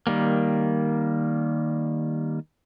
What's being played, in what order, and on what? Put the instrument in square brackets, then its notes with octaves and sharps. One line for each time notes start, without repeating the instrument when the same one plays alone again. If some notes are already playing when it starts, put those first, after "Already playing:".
[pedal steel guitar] D#3 G3 A#3